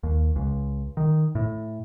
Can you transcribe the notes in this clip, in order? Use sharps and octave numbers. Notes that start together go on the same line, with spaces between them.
D#2
C#2
D#3
A2